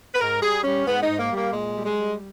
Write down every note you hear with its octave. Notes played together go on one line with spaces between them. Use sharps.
B4
G#2 A#4
G3 G#4
G3 C#4
G#2 B3
D#4
G#2
A#3
G3
A#3
A#2 G#3
G3
G#3
G3